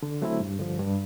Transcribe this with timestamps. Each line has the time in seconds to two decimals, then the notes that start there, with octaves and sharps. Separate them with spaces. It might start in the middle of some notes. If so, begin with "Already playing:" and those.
0.03 D3
0.22 F#3 A3 C4 E4
0.40 G2
0.59 D3 F3
0.79 G2